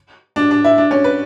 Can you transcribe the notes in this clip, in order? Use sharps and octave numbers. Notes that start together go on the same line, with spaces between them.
D4
D4
E4
D4
C#4
B4